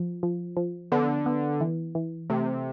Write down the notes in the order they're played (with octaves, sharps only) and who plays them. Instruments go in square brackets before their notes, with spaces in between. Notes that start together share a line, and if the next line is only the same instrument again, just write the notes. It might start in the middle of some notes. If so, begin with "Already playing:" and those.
Already playing: [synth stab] F3
F3
F3
[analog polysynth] D3 [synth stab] B3
[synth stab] B3
E3
E3
[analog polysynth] C3 [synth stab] A3